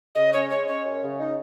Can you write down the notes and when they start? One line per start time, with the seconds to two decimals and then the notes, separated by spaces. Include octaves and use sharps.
0.15 C#3 D#5
0.33 C#4 C#5
0.49 G#3 C#5
0.67 C#4 C#5
0.84 F#2
1.02 C#3
1.19 D#4